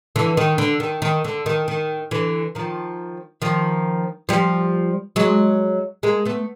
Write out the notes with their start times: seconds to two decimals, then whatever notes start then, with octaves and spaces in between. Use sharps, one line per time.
0.16 D3 E3
0.37 D#3
0.58 D3
0.80 D#3
1.02 D#3
1.24 D3
1.46 D#3
1.68 D#3
2.11 D3 E3
2.55 D#3 F3
3.42 D#3 F3
4.29 F3 G3
5.16 F#3 G#3
6.03 G#3 A#3
6.25 A3 B3